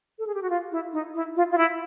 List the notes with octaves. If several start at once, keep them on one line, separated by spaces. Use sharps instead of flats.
A4
G#4
G4
F#4
F4
E4
D#4
E4
F4
F4
E4